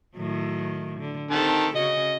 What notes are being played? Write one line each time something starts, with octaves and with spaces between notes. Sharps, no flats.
A2 D#3 F#3
D3
D#3 C4 G4 A4 A5
C#3 C#4 F#4 D#5